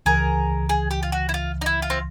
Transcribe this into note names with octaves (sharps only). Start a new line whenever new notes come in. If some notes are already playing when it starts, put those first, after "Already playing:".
C#2 C#3 E3 G#4 A#4
G#4
G4
F4
F#4
E4
F4
D#4
E4
F4
C4